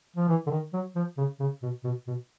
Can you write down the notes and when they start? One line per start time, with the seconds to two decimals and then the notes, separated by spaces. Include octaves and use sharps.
0.16 F3
0.29 E3
0.47 D3
0.50 D#3
0.73 F#3
0.95 F3
1.17 C#3
1.40 C#3
1.62 B2
1.84 B2
2.07 B2